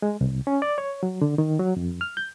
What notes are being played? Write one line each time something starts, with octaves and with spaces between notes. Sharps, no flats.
G#3
C2
C#4
D5
C#5
F#3
D3
D#3
F#3
F2
F6
G6